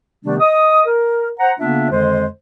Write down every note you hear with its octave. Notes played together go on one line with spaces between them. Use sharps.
C3 D#3 G3 A3 B3 D4
D#5 D#6
A#4
C5 F#5 A#5
C#3 A#3 B3 D4 F4 E5
F2 D3 D#3 G#3 C5